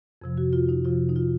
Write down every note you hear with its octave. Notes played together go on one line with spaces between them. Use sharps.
F2 C3 F3
F#4
F4
D#4
F2 C3 F3 F4
D#4
F4